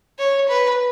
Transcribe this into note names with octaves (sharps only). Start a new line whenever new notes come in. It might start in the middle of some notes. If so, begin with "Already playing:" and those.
C#5
B4